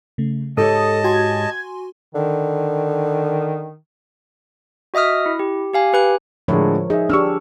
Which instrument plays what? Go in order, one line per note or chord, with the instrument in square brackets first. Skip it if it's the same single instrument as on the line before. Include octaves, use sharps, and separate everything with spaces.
[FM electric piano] C#3 A3
[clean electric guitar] G#2 G4 C#5 [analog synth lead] A4 [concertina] D#5 A5 [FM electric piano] D#6
[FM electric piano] F#4 G#5 C6 [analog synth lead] G#6
[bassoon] D3 [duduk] D#3
[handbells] F#4 D#5 E5 D#6 F6
E4
G4
G4 F5 G#5
G4 B4 G#5 F#6
[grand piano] A2 D3 G#3 [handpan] F3 A#4 C#5
[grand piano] D#4 E5 [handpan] G#4
[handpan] D4 G4 [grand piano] C#6 E6 F6